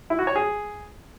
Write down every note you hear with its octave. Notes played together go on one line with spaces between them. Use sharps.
E4
F#4
C#5
G#4